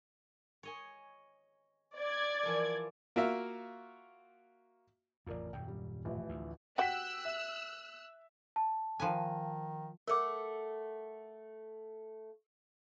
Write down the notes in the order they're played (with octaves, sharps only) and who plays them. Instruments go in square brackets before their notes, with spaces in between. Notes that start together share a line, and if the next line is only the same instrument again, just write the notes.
[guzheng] C#5 D#5 G#5
[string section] D5 G#6
[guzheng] E3 F3 A#4
[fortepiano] A#3 F4 F#4 E5
[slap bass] A1 F2 [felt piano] F4 A#4 D5
[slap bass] D#1 F#2 [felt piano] G5
[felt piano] G3
A1 E3 F3
[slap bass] D2
[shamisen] F#4 G4 F#5 [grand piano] G5 B6 [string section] E6 F#6
[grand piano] E5
[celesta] A5
[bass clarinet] D#3 [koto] F3 B4 G#5
[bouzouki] A3 F#5 [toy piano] A#4 D6